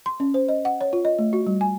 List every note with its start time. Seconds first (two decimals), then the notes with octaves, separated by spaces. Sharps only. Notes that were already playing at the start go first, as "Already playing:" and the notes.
0.06 C6
0.20 C#4
0.34 C5
0.48 D#5
0.65 F#5
0.81 C#5
0.93 F4
1.05 D#5
1.19 A3
1.33 F#4
1.47 G3
1.61 G#5